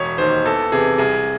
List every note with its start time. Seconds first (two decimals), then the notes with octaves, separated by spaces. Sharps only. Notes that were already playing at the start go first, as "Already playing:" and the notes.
Already playing: E1 C#5
0.18 D#2 D#3 C5
0.45 E2 A4
0.72 C3 E3 G#4
0.98 C2 G#4